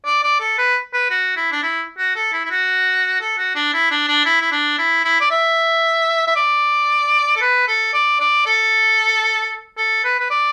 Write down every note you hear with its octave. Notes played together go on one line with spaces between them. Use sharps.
D5
D5
A4
B4
B4
F#4
E4
D4
E4
F#4
A4
E4
E4
F#4
A4
F#4
D4
E4
D4
D4
E4
E4
D4
E4
E4
D5
E5
E5
D5
A4
B4
A4
D5
D5
A4
A4
B4
B4
D5